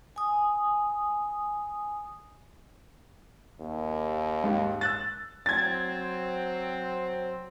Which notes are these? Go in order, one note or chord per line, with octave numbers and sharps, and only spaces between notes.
G#5 D#6
D#2
G#2
E6 F#6 A6
F#3 C4 G#6 A6